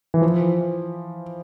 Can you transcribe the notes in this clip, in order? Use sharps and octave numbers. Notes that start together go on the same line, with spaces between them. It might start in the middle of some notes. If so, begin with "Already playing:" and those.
E3
F3